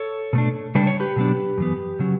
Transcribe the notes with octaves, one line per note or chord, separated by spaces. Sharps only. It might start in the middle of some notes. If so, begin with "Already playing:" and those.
Already playing: A4 C#5
B2 A3 D4
C#3 G3 D4 B4
C#5
G4 B4
B2 F#3 B3 D4
F#2 E3 B3
C#3 F#3 C#4